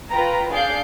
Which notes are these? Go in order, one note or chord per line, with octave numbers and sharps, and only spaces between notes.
F4 B4 G5 A#5
D4 G#4 D5 F5 G6 C7